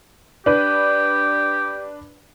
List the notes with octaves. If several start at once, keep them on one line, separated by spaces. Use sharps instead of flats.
D4 G4 B4